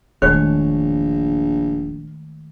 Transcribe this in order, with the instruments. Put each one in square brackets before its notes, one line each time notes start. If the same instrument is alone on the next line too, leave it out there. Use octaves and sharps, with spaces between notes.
[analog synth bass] E1 [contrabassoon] A#1 [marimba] D#3 G#3 A3 [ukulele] C#5